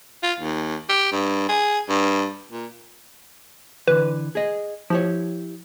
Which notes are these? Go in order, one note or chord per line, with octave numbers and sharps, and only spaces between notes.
F4
D#2
G4
G2
G#4
G2
A#2
D3 E3 B4
G#4 D#5
F3 E4 G4 C#5